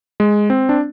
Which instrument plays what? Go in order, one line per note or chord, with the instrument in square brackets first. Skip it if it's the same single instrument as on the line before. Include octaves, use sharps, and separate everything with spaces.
[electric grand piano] G#3
C4
D4